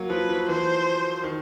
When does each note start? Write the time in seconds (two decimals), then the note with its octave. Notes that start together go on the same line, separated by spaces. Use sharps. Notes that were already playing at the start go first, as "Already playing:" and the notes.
Already playing: F#3 A#3
0.10 F3 B4
0.29 F3
0.48 E3 C5
1.24 D#3